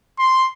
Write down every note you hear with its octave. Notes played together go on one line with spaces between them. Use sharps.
C6